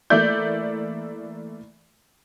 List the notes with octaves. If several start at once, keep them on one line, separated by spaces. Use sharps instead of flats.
E3 A3 A#3 D5 E5 G6